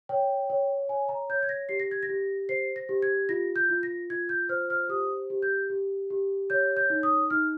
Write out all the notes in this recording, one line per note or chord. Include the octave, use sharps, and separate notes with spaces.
C#5 G5
C#5
C#5 G#5
A#5
C#5 G6
G#6
A#6
G4 C7
A#6
G#6
A#6
G4
C5 C7
A#6
G4
G#6
F4 A#6
G6
F4
A#6
F4 G#6
G6
C5 F6
F6
G4 D#6
G4
G6
G4
G4
C#5 G6
G6
D#4
D#6
D#4 F6